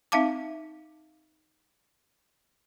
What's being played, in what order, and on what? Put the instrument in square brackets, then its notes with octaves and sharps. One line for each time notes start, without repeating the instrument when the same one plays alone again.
[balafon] C4 D#4 E5 F5 A5 D6